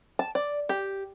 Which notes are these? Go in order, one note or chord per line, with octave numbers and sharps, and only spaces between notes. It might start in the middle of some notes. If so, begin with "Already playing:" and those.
A5
D5
G4